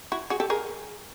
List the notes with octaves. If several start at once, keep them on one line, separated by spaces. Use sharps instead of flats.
E4 F#4
F#4 G#4
G4 A4
G#4 A#4